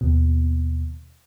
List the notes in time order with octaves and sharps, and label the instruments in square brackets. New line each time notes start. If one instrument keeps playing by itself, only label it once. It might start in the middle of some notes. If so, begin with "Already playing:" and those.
[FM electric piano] D#2 B2